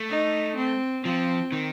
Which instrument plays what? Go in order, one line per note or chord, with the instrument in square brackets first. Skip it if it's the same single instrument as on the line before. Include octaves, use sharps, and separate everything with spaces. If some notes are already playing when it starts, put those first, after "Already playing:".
Already playing: [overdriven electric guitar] A3
[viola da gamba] D#4
C4
[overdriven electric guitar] F3 [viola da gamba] C4
[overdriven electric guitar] D#3